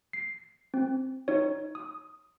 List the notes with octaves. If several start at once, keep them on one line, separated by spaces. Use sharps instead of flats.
C7
C4
D#4 C#5
D#6